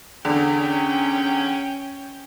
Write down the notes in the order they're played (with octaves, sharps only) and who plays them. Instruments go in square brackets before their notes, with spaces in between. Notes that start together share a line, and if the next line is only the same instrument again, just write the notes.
[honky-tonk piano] E2 D3 [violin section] C#4 G5